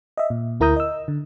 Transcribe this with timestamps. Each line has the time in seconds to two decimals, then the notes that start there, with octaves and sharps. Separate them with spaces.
0.17 D#5 E5
0.30 A#2
0.60 D2 E4 A#4 A#5 D#6 G6
0.76 D#5 E6
1.08 D3